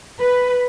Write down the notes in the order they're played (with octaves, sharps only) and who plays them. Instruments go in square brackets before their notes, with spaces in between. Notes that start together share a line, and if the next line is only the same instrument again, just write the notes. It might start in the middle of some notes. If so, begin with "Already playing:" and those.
[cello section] B4